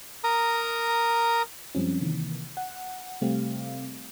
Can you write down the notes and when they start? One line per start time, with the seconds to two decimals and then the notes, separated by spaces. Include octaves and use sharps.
0.24 A#4 A#5 D#6
1.75 F#2 F3 G3 G#3 C4 C#4
2.01 C3 D#3 E3 A#3
2.57 F#5
3.21 C3 G3 A3 C4 G4 F5